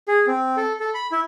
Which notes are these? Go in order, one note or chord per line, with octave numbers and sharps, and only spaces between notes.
G#4
C4
A4
A4
B5
E4